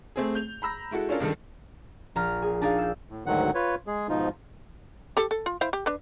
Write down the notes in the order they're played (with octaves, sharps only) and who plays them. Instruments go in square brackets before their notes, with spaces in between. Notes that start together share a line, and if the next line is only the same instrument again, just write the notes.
[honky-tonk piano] A3 C4 G#4
G6 F7
A#5 B5 E6 A#6
G#3 E4 F#4 A4
C#4 D4 F4 A4 A#4
C#2 G2 D#3 A4
[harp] A#1 A#5 F6
G#4
D4 D#4 G#4 F5
E6 G6
[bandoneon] A2
D2 G#2 D3 D#3 F#3 F#5
F4 B4 C#5
G#3 G#4
G#2 B2 F3 D#4 F4
[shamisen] G4 A4
A4
F4
E4 C5 F5
G4
D4 B4